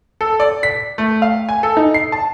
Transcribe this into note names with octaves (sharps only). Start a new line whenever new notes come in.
A4
D5
B6
A3
F5
G#5
A4
D#4
C7
A5